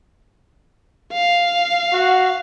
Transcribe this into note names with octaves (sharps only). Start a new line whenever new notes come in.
F5
F#4